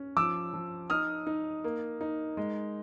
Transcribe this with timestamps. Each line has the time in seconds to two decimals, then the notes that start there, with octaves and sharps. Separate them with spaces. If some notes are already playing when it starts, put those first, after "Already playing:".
Already playing: C#4
0.17 F3 D6 E6
0.54 F3
0.90 D#4 D#6 F6
1.27 D#4
1.64 A#3
2.01 D#4
2.37 G#3